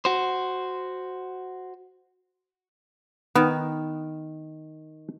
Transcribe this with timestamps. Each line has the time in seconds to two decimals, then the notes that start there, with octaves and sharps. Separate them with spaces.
0.05 F#4 C5
3.36 D#3 B3